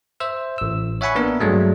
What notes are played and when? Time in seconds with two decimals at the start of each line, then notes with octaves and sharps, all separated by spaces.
0.20 C5 E5 E6
0.58 A1 E6
1.01 C#5 E5 F#5 G#5 B5 C#6
1.15 A#3 B3 D4 A#4
1.40 G2 F#3 G#3 A3 D4